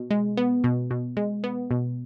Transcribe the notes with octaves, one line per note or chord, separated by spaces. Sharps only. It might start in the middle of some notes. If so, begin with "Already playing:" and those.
Already playing: B2
G#3
B3
B2
B2
G#3
B3
B2